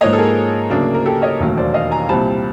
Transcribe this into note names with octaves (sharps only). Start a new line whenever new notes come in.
G#2 F3 A#3 C#5 D#5
A4
G#4 A#4
D2 C#3 F#3 A#3 D4
A#4
G4 A4
C#5 D#5
E1 D#2 D#3 F#3 A3
C5 D5
D#5 F5
G#5 A#5
C2 A#2 G3 C4 A5 B5